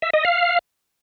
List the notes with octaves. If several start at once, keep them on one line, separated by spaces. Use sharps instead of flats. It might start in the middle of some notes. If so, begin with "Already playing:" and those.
E5
D#5
F5